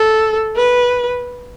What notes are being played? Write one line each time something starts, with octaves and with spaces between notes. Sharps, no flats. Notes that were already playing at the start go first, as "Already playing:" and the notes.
Already playing: A4
B4